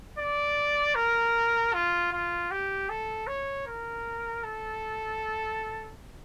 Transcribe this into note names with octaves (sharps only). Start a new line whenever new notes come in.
D5
A#4
F4
F4
G4
A4
C#5
A#4
A4